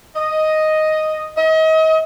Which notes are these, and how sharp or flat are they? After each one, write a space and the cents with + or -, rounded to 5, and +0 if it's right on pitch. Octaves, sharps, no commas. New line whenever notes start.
D#5 +0
D#5 +35